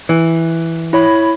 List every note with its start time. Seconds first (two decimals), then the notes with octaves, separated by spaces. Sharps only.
0.09 E3
0.93 E4 C#5 B5